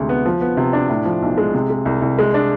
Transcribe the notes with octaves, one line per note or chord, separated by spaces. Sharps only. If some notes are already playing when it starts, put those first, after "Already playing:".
Already playing: D2 C3 G#3
B3
F3
B3
C3
D4
A2
F3
B1
G#3
C3
G#3
C2
C2
G#3
D4